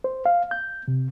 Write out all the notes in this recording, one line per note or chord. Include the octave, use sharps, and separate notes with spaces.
C5
F5
G6
C3